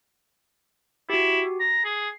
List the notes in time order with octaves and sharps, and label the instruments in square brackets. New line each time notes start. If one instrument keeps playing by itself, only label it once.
[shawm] E4 [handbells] F#4 G4
[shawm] A#5
[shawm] G#4 [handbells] C7